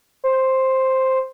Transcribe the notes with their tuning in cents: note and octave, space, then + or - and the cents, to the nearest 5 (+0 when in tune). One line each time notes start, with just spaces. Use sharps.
C5 +5